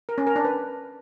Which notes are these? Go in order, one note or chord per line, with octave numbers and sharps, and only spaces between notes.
A#4
C#4
A#4
D4
B4